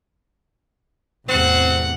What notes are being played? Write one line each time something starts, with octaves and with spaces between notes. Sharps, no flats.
E2 A2 C3 C4 F#5